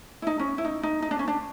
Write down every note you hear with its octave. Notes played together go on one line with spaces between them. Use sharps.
E4
D#4
C#4
E4
D#4
D#4
D#4
D4
C#4
D4